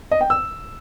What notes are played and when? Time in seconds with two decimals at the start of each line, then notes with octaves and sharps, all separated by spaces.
0.11 D#5
0.21 G5
0.30 E6